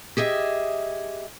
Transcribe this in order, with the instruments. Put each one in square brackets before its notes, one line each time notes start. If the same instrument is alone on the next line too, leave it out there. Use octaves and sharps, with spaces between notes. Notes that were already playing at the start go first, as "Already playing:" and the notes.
[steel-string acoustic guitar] G4 G#4 D#5 E5